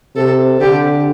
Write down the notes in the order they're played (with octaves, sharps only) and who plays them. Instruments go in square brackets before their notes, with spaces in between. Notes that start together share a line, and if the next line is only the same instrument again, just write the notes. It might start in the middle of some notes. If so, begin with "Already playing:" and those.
[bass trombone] C3 [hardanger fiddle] A4
[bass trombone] D3 [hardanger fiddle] G4